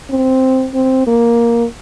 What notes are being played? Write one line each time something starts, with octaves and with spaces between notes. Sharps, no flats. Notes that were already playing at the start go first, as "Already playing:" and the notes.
C4
C4
A#3